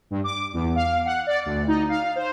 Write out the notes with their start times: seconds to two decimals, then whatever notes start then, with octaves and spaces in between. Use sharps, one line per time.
0.11 G2
0.24 D6
0.54 E2
0.76 F5
1.06 F#5
1.27 D5
1.46 D2
1.68 D#4
1.89 F5
2.16 C5